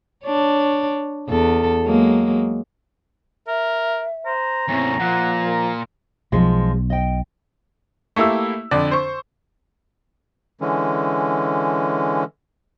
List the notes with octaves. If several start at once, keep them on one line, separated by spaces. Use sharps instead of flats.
D4 C#5
E2 A4
F#3 G#3 A#3
A#4 E5
C5 A#5
E2 A2 C4 C#4
A#2 F3 F#5
A#4
B1 B2 F3 G#3
D#5 G5
A3 A#3 E4 G4 E6
F2 D3 D5
C5 C#6
D3 E3 G#3 C#4